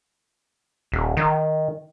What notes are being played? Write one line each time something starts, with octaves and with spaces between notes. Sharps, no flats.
D#1
D#3